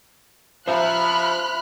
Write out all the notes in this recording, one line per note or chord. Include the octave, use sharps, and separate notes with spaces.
F3 C5 E5 A#5 B5 F6 F#6